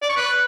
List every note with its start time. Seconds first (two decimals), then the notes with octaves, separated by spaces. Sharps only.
0.02 D5
0.09 C#6
0.17 B4